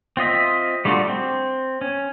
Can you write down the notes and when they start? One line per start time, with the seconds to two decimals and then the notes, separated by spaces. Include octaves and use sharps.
0.17 C4 F4 D#5 E5
0.85 G3 A3 D4 F4 F#4
1.08 C4
1.81 C#4